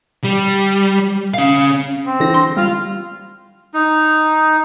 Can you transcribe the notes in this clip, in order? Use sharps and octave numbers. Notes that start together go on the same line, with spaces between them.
G3
C#4 F5
C4
D3 E3 A#6
C6
G3 F4
D#4